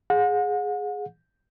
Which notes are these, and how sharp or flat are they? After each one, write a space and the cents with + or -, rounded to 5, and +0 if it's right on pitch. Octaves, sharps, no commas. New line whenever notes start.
G#4 +0 F#5 -40